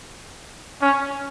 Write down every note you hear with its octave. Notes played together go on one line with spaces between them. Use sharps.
C#4